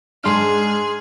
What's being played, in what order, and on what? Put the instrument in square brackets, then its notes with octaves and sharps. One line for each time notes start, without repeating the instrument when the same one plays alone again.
[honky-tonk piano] G#2 D4 [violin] G#4 [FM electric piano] C6 F6